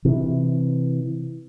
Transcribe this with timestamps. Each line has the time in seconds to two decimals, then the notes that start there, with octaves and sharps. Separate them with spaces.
0.05 C3 E3